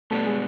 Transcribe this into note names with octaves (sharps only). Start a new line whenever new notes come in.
B2 G3 A3 B3 D4
G#3